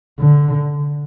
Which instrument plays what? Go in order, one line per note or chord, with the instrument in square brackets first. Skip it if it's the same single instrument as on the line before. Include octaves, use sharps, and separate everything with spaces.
[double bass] D3